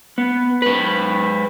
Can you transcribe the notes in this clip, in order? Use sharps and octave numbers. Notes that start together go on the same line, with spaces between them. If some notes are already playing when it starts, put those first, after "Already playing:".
B3
G#2 B4